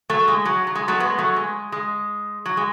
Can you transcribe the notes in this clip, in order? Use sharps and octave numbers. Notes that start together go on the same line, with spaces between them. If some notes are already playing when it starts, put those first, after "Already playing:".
F#3 A3
G#3
F#3
F#3
G#3
F#3 A3
G#3 B3
F#3 A3
G#3
G#3
F#3
G#3